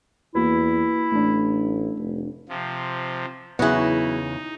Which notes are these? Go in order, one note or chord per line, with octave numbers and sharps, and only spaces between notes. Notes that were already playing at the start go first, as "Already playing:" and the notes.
E2 A#3 E4 F#4 B4
A1 A3 D4
F1
C3 F3
E2 C#3 F#3 B3 D#4 E4 G#4